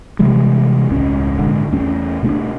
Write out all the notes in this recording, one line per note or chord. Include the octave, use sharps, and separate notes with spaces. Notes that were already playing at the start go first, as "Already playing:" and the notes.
C3 E3 G3 G#3
E1 C#2 A2 C#4
G#1 A#2 D3 G#3
E2 A3 C#4
B2 A3 D4